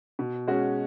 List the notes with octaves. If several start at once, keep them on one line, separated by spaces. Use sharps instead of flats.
B2
G#3 C#4 F#4